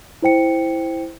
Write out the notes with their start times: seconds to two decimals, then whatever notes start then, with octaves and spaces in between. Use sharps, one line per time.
0.22 E4 C5 G5 C#7